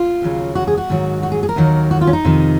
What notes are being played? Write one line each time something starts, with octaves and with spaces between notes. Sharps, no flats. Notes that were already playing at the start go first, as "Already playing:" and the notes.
Already playing: F4
D#2 C#3 F#3
F#4
G#4
F#4
G#2 D#3 F#3
F#4
G#4
G#4
A#4
D#2 D#3 F#3
F#4
F4
C#4
D#4
F2 C3 D#3